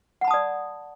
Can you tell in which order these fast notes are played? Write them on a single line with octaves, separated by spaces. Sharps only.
F#5 B5 A5 D#6 D5